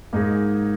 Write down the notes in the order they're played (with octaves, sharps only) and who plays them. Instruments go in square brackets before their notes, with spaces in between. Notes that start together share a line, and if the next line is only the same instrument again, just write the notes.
[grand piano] G#2 [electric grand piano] A#3 D#4 G#4